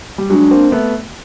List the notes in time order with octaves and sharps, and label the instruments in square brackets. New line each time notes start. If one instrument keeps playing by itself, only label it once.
[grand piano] G3
[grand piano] F#3 G#3 [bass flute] D4
[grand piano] A#3 C4
A3 B3